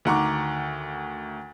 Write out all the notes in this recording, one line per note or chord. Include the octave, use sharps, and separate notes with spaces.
D2 D#3 F#5 A#5 C#6 D6